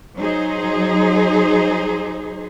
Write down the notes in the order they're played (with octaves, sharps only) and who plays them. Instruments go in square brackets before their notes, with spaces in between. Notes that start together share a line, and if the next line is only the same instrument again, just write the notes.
[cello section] F#3 D#4 G#4 C5